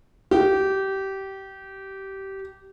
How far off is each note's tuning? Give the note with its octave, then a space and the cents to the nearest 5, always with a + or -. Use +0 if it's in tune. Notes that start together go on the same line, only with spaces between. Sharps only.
G4 -20